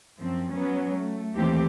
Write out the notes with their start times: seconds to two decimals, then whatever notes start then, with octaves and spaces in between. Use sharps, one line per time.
0.21 F#2 F3 C4
0.53 F#3 B3 C#4
0.98 A3
1.35 D#2 E3 A3 C4 G4